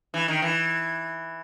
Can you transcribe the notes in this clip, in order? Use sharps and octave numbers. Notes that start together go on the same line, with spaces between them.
E3
D#3
E3